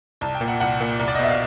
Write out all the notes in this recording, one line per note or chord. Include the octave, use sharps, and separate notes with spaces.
C2 A5
G5
A#2
F#5
C2 F#5
A#2
C2
D5
D#5
B2 E5
F5